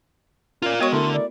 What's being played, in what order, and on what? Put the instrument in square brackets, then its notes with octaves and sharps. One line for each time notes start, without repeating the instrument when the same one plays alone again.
[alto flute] C#4 [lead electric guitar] F4 D5 [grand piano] A#4 F5
[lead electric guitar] G#3 D#5 [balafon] B3 F#4 C#6 [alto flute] C#5
[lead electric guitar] D3 [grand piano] A3 E4 A#4 [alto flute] C6
[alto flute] D5